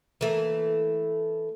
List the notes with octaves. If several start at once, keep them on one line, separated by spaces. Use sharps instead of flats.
E3 A3 A#3